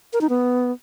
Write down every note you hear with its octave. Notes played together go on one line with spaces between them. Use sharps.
A#4
D#4
B3